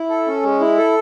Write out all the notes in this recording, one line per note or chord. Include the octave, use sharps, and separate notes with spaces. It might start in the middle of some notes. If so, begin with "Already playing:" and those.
Already playing: E4
A4
C#4
G#3
E4
A4